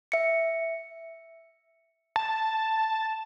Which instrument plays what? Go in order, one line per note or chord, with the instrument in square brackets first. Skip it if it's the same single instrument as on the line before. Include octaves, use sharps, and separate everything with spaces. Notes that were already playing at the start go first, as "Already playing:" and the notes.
[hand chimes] E5 C#7
[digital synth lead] A5